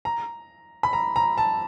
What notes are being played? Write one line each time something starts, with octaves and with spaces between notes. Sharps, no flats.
A#5
B5
A#5
A#5
A5